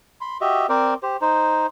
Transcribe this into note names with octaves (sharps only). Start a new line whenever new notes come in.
B5 C6
F#4 G4 D#5 E5
C4 A#4 C5 D5
G4 C5
D#4 C5